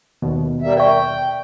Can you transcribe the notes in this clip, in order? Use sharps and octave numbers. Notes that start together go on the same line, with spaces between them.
D#2 B2
G3 A#3 E5
D5 E5 G5 C#6